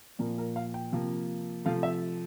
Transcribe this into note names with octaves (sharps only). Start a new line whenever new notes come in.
A#2 F3 A#3 A#4
A#4
F5
G5
C3 F3 A#3
C3 F3 A3 F5
E5